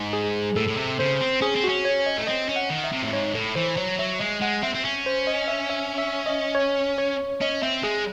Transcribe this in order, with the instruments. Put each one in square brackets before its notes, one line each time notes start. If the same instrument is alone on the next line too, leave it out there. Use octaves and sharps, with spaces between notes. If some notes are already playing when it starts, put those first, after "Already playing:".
Already playing: [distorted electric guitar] G#2
[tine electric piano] G#4
[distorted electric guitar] A2 [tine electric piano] A4
[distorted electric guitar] A2
C3
[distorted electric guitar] C#3 [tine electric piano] C5
[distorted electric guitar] C4
[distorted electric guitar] C#4 [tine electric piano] G#4
[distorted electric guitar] C4
[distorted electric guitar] C#4 [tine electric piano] F#4
[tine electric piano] C#5
D#5
[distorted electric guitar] A3
[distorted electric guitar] C4 [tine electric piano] D#5
[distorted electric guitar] C#4
[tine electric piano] F#5
[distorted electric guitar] D#3
[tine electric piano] E5
[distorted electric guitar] C3
A2
[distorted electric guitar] G#2 [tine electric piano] C#5
[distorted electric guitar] A2 [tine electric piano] A4
[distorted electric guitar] E3 [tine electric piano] C5
[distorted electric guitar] F#3 [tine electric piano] C#5
[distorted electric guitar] F#3 [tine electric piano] E5
[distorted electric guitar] G#3 [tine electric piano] D#5
[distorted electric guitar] G#3 [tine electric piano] F#5
[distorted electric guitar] C4 [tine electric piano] E5
[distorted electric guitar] C4
C#4
[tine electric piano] C5
D#5
E5
E5
E5
D#5
C#5
C#5
[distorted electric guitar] C#4 [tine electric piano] D#5
[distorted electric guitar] C4 [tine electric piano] E5
[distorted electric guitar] G#3 [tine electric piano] G#4